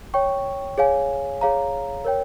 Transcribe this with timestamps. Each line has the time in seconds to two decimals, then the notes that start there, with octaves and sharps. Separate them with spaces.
0.14 C#5 G5 C#6
0.78 G#4 C#5 F5 G#5
1.41 G#4 C#5 F5 A#5
2.05 A#4 C#5 G5